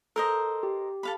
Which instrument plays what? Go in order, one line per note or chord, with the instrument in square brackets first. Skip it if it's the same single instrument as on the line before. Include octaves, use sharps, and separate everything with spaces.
[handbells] A4 [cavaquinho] A#4 C5 D#5
[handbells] G4
[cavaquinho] A4 F5 B5